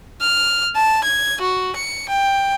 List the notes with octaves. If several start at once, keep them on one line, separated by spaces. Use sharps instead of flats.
F6
A5
G#6
F#4
C#7
G5